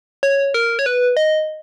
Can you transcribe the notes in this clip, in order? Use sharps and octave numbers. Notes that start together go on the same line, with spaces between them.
C#5
A#4
C#5
B4
D#5